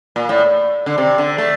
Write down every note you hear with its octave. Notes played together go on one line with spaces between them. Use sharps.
A#2
A2
D3
C3
D3
A3